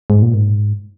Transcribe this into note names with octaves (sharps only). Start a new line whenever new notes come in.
G#2
A#2
G#2